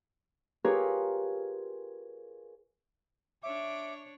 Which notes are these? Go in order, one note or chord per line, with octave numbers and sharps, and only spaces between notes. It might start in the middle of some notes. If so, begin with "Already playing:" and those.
F4 G4 G#4 A#4 B4 C#5
D4 C#5 E5 D6